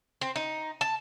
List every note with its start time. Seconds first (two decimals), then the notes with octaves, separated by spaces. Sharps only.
0.21 C4
0.36 D#4
0.81 A5